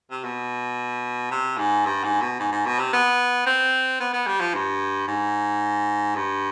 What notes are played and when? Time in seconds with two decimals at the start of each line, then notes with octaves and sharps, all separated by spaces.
0.11 C3
0.24 B2
1.31 C3
1.58 G#2
1.86 G2
2.04 G#2
2.22 B2
2.39 G#2
2.52 G#2
2.66 B2
2.79 C3
2.93 B3
3.46 C4
4.00 B3
4.13 B3
4.27 G3
4.40 F3
4.54 G2
5.08 G#2
6.16 G2